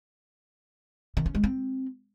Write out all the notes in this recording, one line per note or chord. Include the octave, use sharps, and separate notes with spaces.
D#3
C#4
G#3
C4